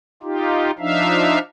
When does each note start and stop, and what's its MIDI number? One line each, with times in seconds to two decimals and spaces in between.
0.23 0.71 63
0.23 0.71 65
0.23 0.71 67
0.79 1.39 53
0.79 1.39 62
0.79 1.39 63
0.79 1.39 76
0.79 1.39 77